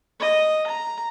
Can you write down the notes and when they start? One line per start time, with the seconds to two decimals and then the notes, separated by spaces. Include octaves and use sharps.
0.20 D#5
0.67 A#5